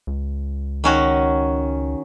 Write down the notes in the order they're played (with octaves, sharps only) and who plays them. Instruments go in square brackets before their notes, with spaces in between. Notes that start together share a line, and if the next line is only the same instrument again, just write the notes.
[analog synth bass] C#2
[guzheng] D#3 C#4 F#4